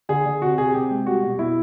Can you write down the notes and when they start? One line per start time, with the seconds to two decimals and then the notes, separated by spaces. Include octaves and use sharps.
0.09 D3 G#4
0.25 D3
0.41 C3 F#4
0.58 C3 G#4
0.74 C3 G4
0.90 G#3
1.06 G3 F#4
1.23 B2
1.39 B2 E4